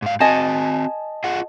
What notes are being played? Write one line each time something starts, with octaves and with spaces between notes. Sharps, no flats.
G#2 F5
C4 F#4 D#5 G#5 A5
F4 G#4 F#5